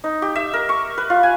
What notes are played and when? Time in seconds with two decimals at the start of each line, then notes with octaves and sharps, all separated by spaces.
0.04 D#4
0.22 G4
0.36 E5
0.53 A#4
0.69 C#6
0.98 B4
1.10 F4
1.23 G#5